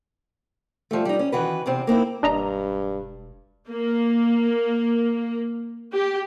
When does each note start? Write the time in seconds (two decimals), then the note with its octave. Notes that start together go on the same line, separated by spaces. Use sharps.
0.91 F3 G3 A3
1.05 G3 D#4
1.19 C#4
1.32 D#3 E3 F#4 B4
1.66 E2 C3 C4
1.87 A#3 C4 D#4 E4
2.23 E1 G2 D4 D#5 A#5
3.69 A#3
5.92 G4